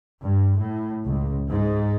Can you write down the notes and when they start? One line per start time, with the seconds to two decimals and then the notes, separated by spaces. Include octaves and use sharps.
0.23 G2
0.58 A2
1.05 C#2
1.48 G#2